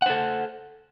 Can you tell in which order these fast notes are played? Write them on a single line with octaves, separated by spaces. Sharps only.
F#5 C5 A4